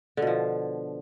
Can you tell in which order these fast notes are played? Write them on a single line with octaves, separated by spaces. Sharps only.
D3 B2 F3